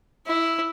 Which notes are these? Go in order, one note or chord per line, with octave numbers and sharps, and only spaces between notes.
E4